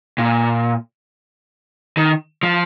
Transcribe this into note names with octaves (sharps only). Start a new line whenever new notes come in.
A#2
D#3
F3